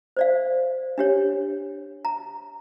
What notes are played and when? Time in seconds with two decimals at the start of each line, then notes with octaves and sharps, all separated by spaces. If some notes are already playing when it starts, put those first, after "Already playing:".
0.17 C5 D5 F5
0.98 D4 G4 C#5
2.05 A#5